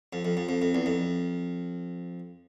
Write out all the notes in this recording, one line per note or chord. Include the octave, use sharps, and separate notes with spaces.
F2
F2
F2
F2
F2
E2
F2